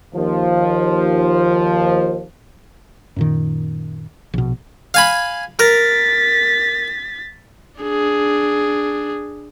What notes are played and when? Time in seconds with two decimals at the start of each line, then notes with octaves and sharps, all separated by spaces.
0.14 D#2 F3
3.16 F#2 A#2 D#3
4.34 A#1 B2
4.94 F5 G#5 B5
5.59 A#4 A6 B6
7.81 D4 G#4